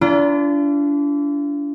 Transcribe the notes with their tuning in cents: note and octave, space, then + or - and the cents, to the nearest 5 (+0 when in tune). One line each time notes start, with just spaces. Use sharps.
D4 -30 F4 -45 A#5 +25